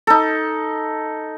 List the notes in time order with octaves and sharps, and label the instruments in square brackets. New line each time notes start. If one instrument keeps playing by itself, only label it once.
[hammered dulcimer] D#4 A4